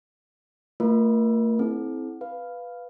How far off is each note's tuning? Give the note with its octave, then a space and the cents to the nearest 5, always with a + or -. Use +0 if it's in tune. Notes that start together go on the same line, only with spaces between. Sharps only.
A3 +40 F4 -20 A#4 +30
C4 +0 E4 -20 A4 -45
B4 +0 F5 +0